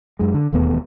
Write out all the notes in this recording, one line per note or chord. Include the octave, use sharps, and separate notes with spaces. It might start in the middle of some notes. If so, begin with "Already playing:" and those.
F#2 G#3
D3
E1 D#2 A3 B3